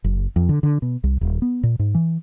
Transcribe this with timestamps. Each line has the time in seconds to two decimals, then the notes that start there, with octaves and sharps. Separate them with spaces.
0.04 F#1
0.36 F2
0.49 D3
0.63 D3
0.82 B2
1.04 C2
1.21 D#1
1.42 B3
1.63 A#2
1.79 G#2
1.95 E3